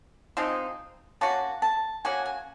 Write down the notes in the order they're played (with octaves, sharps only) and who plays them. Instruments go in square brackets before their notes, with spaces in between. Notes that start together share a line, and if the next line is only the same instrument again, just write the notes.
[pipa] F3 G#3 C4 D#4
[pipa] A#3 C#4 F#4 [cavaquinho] A5
[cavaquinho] A5
[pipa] A#3 C#4 F#4 [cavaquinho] G#5
[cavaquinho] G#5